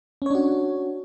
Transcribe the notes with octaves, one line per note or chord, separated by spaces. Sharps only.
C#4 D4 F#4 C#5